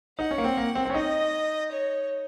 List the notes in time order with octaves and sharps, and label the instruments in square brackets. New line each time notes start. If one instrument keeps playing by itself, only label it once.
[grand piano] D#4 [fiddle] F#5
[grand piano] C#4
A#3
C4
A#3
C4
C4
C#4
[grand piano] D#4 [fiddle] D#5
[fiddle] C#5